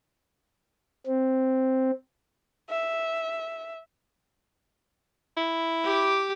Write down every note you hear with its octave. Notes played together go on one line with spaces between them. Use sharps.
C4
E5
E4
G4 D6